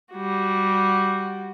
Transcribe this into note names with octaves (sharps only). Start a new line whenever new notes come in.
G3 F#4